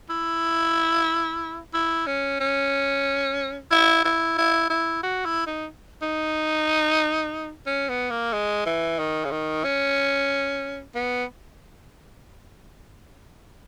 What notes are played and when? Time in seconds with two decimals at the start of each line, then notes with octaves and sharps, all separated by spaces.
0.10 E4
1.74 E4
2.07 C#4
2.40 C#4
3.71 E4
4.04 E4
4.38 E4
4.70 E4
5.03 F#4
5.25 E4
5.47 D#4
6.02 D#4
7.66 C#4
7.89 B3
8.10 A#3
8.33 G#3
8.66 E3
8.99 D#3
9.25 C#3
9.31 D#3
9.64 C#4
10.95 B3